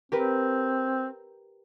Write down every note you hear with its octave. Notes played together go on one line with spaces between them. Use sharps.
C4 G4 A#4 B4